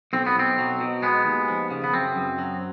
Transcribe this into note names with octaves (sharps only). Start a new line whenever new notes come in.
B1 C4
B3
B1 C4
F#3
B2
G#3 B3
D#2
F3
C#3
B3
F#2 C4
F#2
F#3